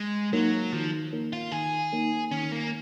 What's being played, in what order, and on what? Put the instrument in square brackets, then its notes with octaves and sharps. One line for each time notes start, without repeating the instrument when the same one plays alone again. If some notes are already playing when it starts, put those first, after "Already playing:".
Already playing: [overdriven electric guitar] G#3
[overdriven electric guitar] F#3 [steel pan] A#3 D#4 A#4 C#5
[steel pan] D#3 [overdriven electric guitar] F3
[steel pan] A#3 D#4 A#4 C#5
[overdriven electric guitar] F4
[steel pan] D#3 [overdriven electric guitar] G#4
[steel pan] A#3 D#4 A#4 C#5
[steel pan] D#3 [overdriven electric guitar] C#4
[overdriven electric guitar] A#3